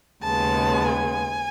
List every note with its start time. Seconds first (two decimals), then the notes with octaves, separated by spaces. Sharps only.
0.23 D#2 C#3 G#3 B3 A5
0.88 G#5